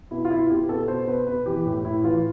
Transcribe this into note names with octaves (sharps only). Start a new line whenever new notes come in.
B2 E4
F4
B2 E4
B2 G4
B2 A4
B2 C5
B2 B4
B2 B4
E3 G4
A2
A2 E4
E3 F4